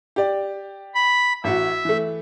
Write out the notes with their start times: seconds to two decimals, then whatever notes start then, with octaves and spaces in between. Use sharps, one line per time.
0.16 G4 D5
0.95 B5
1.44 A1 F#4 E5
1.85 E3 A3